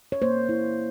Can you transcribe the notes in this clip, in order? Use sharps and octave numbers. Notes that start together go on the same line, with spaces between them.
C#5
A#3 C5
E4